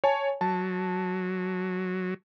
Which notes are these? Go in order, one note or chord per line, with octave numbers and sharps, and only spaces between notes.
C#5 G#5 A5
F#3 A5